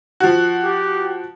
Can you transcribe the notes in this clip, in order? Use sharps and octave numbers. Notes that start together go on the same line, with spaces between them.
F3 F#4
G4